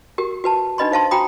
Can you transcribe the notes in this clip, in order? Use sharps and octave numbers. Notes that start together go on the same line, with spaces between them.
F#4 G4 A#4
F#4 B4 A5
D4 D#4 B4 D#5 B5 C6
D#4 C5 F5 A5 C6
F#4 G5 A#5 B5 D#6